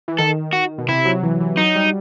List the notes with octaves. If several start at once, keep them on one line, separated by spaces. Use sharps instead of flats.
E3
D#3 A4
F#4
B2
C3 E4
F#3
E3
E3
F#3 D#4
G3